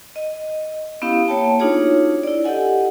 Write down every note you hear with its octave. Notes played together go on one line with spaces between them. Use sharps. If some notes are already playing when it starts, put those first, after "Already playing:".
D#5
B3 C#4 E4 G4 F5 D#6
A#3 B3 C#5 G5 A5
D4 D#4 F4 F#4 G#4 C#5
E4 D5
G4 A4 D#5 F#5 G#5